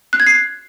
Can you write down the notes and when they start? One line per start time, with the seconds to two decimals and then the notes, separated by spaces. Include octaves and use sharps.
0.13 F#6
0.20 G#6
0.26 C7